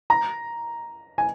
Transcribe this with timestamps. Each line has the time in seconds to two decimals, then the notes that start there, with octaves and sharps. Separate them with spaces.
0.10 A#5
1.18 G#5